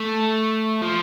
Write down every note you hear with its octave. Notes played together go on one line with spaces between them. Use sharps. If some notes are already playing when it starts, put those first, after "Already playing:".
Already playing: A3
F3